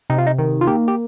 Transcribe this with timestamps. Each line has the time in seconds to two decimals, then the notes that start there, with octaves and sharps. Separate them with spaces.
0.10 C3 D#4
0.18 F4
0.27 D#4
0.39 D#3
0.61 F4
0.67 A#3 G4
0.88 G4